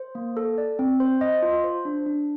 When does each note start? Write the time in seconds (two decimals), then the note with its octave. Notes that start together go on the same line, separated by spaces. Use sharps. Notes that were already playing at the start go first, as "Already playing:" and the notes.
Already playing: C5
0.15 A#3
0.37 A4
0.58 D5
0.79 C4
1.00 C5
1.21 D#5
1.42 F4
1.64 C5
1.85 D4
2.06 D4